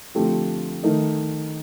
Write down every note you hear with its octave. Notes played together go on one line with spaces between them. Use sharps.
D3 F3 A3 C4 G4
D#3 A3 D#4